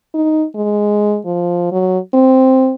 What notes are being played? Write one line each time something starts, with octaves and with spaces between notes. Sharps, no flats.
D#4
G#3
F3
F#3
C4